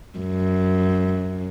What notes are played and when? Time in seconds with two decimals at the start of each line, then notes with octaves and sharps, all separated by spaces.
0.19 F#2